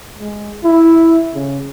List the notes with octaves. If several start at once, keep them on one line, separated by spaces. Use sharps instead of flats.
G#3
E4
C#3